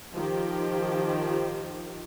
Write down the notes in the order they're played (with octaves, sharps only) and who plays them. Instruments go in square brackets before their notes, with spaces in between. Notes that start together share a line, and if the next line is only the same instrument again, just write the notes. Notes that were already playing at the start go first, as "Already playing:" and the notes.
[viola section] D#3 F3 G4